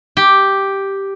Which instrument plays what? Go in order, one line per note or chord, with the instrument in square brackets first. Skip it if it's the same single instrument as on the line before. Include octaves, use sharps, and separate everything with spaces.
[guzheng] G4